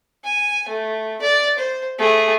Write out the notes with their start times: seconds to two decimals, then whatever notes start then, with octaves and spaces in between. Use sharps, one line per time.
0.24 G#5
0.68 A3
1.22 D5
1.59 C5
1.98 A3 G#4